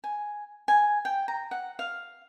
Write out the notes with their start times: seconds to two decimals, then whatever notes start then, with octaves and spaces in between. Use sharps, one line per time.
0.04 G#5
0.68 G#5
1.05 G5
1.28 A#5
1.51 F#5
1.79 F5